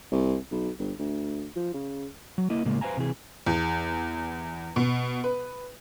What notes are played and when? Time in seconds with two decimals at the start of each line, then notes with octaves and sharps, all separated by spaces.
0.12 C2
0.51 B1
0.79 G1
0.99 D2
1.56 F3
1.74 C#3
2.38 F#3
2.50 A#3 E4 D#5
2.65 A2 C#3 G#3 A#3
2.81 B4 C5 E5 F5 G#5 A#5
2.97 C3 E3 G#4
3.46 E2
4.76 B2
5.24 B4